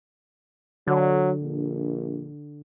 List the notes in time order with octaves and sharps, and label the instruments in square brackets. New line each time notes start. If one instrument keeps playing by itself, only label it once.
[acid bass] D3 [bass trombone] F#3
[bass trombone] A#1